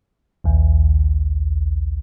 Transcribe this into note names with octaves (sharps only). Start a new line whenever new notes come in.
A#1 D#2